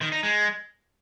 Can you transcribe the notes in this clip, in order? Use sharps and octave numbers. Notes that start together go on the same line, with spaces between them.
D#3
D#4
G#3